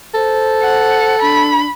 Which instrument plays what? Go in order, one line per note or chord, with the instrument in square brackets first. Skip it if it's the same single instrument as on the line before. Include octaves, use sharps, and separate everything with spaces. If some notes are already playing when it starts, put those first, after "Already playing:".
[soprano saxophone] A4 [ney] C5
[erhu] F#5
[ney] D4 [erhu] B5